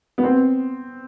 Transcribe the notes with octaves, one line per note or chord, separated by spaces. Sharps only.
B3
C4